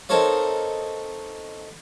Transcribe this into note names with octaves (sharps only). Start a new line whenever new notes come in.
C4 D#4 A4 A#4 C#5 F5